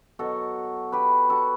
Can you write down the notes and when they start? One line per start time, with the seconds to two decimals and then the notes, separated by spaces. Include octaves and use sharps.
0.19 B2 F#3 F#4 A4
0.92 G4 B4
1.30 F#4 A4